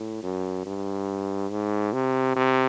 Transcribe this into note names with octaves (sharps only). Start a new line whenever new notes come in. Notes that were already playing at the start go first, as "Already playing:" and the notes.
Already playing: A2
F#2
G2
G#2
C3
C3